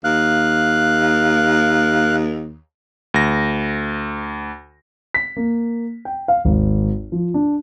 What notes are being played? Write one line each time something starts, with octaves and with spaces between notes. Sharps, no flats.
D#2 F5 F#6
D2 A#6
B6
A#3
G5
F5
G#1
F3
D4